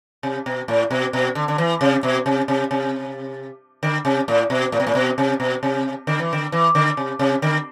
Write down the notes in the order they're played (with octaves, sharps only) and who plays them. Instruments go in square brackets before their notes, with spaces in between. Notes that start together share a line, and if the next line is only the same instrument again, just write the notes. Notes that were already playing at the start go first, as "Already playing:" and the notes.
[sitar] C3
B2
A2
B2
B2
D3
D3
E3
C3
B2
C3
C3
C3
D3
C3
A2
B2
A2
B2
A2
B2
C3
B2
C3
D3
E3
D3
E3
D3
C3
C3
D3